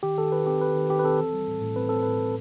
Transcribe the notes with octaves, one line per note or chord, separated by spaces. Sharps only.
D#3 G4
D#3 A4
D#3 B4
C4 G4
D#3 B4
D#3
D#3 G4
B4
C4 A4
E3
G3
A2
A2
C4 B4
C4 A4
A2 B4
A2